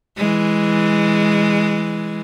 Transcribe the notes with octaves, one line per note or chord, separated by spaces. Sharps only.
E3 G#3